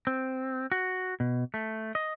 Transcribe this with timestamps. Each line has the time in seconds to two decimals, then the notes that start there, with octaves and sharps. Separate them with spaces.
0.07 C4
0.72 F#4
1.20 B2
1.54 A3
1.95 D#5